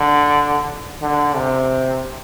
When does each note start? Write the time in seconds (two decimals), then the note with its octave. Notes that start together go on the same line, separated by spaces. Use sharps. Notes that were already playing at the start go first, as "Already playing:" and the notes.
Already playing: D3
1.02 D3
1.36 C3